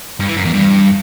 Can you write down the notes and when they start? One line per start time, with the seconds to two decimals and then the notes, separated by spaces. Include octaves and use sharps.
0.20 G2
0.28 E3
0.37 F#2
0.45 E2
0.54 G2